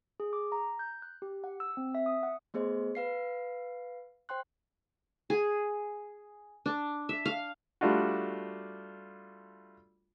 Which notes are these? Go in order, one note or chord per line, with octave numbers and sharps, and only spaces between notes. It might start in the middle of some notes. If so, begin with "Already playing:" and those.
G#4
D6
A#5
G6
F#6
G4
F#5
E6
C4
E5
D#6
F#5
A3 B3 G#4 C5 D#5
B4 F5 C7
C5 G5 C6 F#6
G#4
D4
E5
F5
G3 A3 D4 F4 F#4